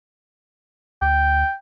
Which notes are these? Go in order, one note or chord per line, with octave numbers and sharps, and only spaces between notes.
D2 G5